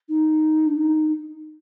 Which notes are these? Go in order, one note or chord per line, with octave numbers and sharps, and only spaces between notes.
D#4
D4
D#4